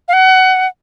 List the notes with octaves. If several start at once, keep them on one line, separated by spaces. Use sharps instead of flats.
F5
F#5